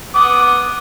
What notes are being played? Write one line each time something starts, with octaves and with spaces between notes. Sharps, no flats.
B3 D6 D#6